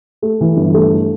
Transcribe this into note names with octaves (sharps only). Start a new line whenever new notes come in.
A3
E3
G1
A3